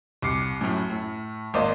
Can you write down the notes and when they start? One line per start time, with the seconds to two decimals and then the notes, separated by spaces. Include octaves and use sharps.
0.22 C2 D6 C7 C#7
0.61 F#2 A2
0.90 A2
1.54 G#1 A#3 C5 D5 D#5